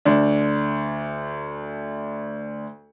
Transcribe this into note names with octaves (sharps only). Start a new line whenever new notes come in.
D2 D4